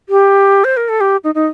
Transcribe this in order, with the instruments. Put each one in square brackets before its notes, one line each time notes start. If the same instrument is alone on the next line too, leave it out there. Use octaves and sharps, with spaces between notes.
[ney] G4
C5
A#4
A4
G4
D#4
D#4